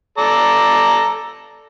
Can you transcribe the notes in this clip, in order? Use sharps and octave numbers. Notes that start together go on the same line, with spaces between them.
A4 D5 A#5